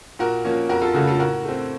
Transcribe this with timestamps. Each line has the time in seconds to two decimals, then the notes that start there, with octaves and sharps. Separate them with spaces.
0.19 A#2 F#4 A#4
0.45 F3 A#3 C#4
0.69 F2 F#4 A#4
0.82 F4 A4
0.94 C#3 A3 C#4 F#4
1.07 F4 A4
1.19 A2 F#4 A#4
1.45 A3 C4